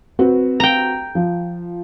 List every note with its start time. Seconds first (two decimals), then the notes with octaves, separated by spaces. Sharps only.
0.19 C4 F#4 B4
0.60 G5 A#5
1.15 F3